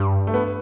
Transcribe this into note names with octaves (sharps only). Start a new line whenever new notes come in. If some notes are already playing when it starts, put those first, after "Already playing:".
Already playing: G2 G3
A3
B3